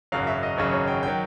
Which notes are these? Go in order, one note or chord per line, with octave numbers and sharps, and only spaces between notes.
G#1 F#2 C#3 F#3 F5
E5
D#5
G#1 F#2 C#3 F#3 C#5
C#5
G5
D#3 F#3 G5